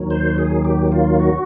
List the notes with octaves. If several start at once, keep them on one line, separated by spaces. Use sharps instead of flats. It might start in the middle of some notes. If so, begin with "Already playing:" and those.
Already playing: D#2 D#3 F#3
C5
G#4
G4
F4
F#4